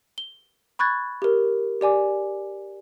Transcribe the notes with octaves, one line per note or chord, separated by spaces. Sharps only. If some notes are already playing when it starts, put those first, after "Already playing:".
G7
B5 C#6 F#6 G#6 A6
G4 A#4
G4 D5 G#5 D6